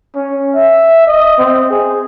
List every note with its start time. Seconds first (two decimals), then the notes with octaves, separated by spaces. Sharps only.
0.15 C#4
0.56 E5
1.07 D#5
1.38 C4
1.70 G#4